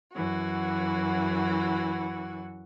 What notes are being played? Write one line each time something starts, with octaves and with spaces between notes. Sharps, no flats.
F#2 E3 F#4